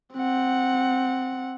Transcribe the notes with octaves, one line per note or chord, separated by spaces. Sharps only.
C4 F#5